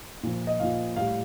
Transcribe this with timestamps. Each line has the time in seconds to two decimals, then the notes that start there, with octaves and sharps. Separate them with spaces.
0.23 A#2 F3
0.47 D#5
0.60 A#2 F3 F5
0.96 A2 G3 F5